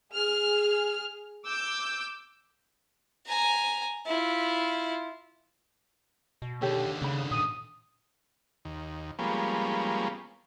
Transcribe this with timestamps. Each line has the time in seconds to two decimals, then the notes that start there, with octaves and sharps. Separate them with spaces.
0.11 G#4 F6
1.45 D6 E6 G6
3.27 G#5 A#5
4.07 E4 F4
6.42 B2
6.62 D#2 D3 G4 A4 C#5
7.02 C#3 C#4 B5
7.31 A#2 D#6
8.65 D#2
9.19 F3 G3 G#3 A#3 B3 C#4